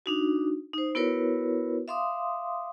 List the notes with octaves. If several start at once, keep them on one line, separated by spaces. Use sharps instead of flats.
D4 D#4 F#4
D#4 C5
B3 E4 F#4 A#4 B4 C#5
E5 F5 C6 D6 D#6